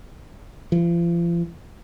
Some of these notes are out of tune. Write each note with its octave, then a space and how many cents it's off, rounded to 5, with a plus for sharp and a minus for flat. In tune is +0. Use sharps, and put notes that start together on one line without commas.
F3 -40